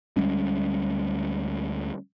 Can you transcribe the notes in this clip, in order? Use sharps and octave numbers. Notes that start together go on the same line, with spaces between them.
D2 G3 G#3 C#4